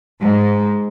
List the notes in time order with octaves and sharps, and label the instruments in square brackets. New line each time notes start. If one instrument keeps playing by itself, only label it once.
[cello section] G#2